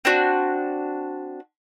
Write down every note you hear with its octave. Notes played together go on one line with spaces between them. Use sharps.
C4 D4 F#4